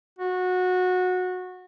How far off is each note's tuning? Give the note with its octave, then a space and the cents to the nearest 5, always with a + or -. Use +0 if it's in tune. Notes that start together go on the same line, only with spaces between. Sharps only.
F#4 -20